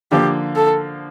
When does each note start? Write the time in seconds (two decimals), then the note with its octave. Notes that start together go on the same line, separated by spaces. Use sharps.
0.12 D3 F3 A#3 G4
0.56 A4